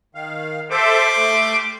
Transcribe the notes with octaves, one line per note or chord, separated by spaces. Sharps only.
D#3 F5
G3 A4 C5 E5 C6 D6
A3